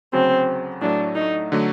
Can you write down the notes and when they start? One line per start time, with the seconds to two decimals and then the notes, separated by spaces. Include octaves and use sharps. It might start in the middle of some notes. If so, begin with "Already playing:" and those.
0.13 D2 C#3 F#3 C4
0.81 A2 F#3 A3 D4
1.15 D#4
1.52 D3 F#3 A3